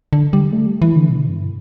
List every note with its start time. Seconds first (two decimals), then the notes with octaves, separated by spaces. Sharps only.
0.13 D3
0.33 G3
0.52 A3
0.67 G3
0.82 E3
0.96 D3
1.10 B2
1.29 G2